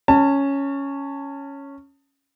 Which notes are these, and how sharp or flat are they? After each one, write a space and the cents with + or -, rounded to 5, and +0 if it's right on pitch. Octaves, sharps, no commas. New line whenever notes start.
C#4 +0 A5 +30